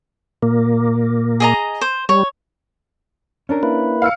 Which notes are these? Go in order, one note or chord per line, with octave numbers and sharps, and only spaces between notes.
A#2 A#3
G#4 D#5 A#5
C5
G3 C#5
C#4 D4 A#4
A#3 E4 B4
F5 E6 C#7